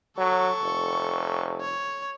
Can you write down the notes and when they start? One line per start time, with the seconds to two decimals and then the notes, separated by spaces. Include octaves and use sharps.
0.18 F#3 A4 C#6
0.63 F1
1.61 C#5